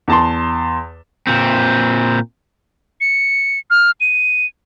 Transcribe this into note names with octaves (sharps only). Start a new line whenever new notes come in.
E2 A5 C6
A#2 C4
C#7
F6
D#7